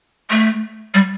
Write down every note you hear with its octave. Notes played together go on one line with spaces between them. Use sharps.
A3
G3